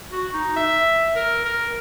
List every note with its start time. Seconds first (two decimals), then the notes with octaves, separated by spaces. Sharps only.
0.12 F#4
0.34 D#4
0.56 E5
1.16 A#4
1.45 A#4